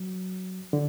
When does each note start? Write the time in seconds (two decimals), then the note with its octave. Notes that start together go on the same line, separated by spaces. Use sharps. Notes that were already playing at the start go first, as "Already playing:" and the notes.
Already playing: F#3
0.73 D3